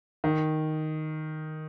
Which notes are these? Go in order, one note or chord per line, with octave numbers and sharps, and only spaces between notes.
D#3